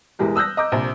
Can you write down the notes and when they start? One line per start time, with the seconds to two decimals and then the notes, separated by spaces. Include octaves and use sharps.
0.19 E1 E3 G#3 G4 A#4
0.36 D#6 E6 F#6 G6 A#6
0.57 D#5 A#5 D6 G6
0.72 A#1 C3